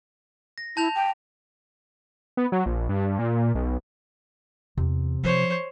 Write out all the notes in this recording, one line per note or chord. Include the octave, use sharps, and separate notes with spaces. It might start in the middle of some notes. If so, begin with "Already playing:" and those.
A#6
E4 A5 G6 F7
G5
B3
F#3
A#1
G2
A#2
B1
E2 C3
F3 F#3 C5 C#5